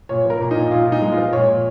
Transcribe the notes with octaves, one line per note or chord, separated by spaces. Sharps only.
A#2 C#5
F3 A#4
A#2
A#2 D#4
A#2 F4
A#2
D#4
G#3
F4
F3
A#2 C#5
A#2